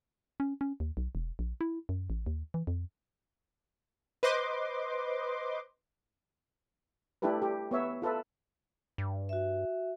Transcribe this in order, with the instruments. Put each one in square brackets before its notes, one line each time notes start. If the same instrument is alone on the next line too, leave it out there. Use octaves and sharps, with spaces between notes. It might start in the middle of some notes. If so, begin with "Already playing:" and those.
[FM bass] C#4
C#4
D#2
B1
E1
A#1
E4
F#2
A1
D#2
E3
F2
[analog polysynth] B4 C5 D#5 C6 D6
[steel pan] A3 D4 E4 G4 A4 B4
G4
B3 C#5 E5
F4 A4 B4 E5
[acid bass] G2
[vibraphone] F#4 E5